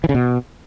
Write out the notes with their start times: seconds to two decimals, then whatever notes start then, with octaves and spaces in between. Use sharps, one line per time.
0.04 E3
0.09 C#3
0.14 B2